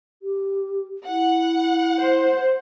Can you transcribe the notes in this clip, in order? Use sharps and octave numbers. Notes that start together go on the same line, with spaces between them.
G4
E4 F#5
C5